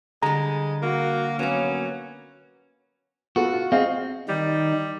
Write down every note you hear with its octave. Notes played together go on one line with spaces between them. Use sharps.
D3 G3 G#3 A#5
A#3 F#4
F#3 A#3 B3 C#4
B3 F4 F#4 A4
F4
C4 G#4 D#5 F5
D#3 G3 D#4